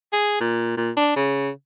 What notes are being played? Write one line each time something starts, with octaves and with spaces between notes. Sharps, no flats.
G#4
A#2
A#2
D4
C#3